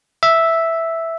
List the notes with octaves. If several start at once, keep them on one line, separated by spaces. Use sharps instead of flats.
E5